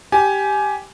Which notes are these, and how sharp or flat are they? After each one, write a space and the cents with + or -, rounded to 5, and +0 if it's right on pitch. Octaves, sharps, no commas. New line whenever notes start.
G4 +0 G#5 +15